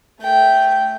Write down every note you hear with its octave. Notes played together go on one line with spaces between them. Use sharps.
A3 G5